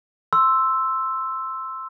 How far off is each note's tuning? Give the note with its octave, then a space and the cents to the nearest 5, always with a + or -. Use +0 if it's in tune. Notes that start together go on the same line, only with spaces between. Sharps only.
C6 +0 E6 +0